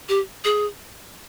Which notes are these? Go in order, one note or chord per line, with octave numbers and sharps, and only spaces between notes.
G4
G#4